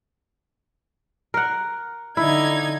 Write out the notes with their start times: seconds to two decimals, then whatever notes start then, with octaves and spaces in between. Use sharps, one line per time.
1.34 A#4 F#5
2.17 D3 D#4 E4 G#6